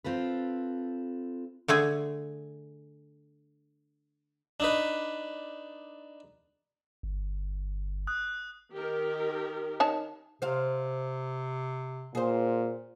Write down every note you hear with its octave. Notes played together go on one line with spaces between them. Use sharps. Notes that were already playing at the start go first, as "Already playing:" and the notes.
C4 F4 A4 B4
D3 A3 G#4 G#5
D4 D#4 B4
G1
D#6 F#6
D#3 G4 A#4
D#4 C#5 A5
C3 C5 F5
A#2 G#4 C5